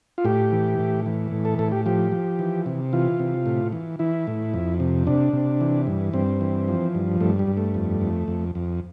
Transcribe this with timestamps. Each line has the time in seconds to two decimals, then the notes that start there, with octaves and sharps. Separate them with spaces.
0.18 F4
0.25 A2 G4
0.52 E3
0.79 A2
1.06 E3
1.32 A2
1.45 A4
1.59 A2 A4
1.72 G4
1.86 F3 G4
2.12 F3
2.39 E3
2.66 C3
2.93 E3 F4
3.19 C3
3.46 A2
3.72 E3
3.99 E3 E4
4.27 A2
4.54 F2
4.80 C3
5.07 C3 D4
5.33 C3
5.61 E3
5.87 G2
6.13 G2 C4
6.41 E3
6.68 F3
6.95 G2
7.21 G2 A3
7.39 G3
7.47 G2
7.57 A3
7.74 F2
8.01 F2
8.28 F2
8.55 F2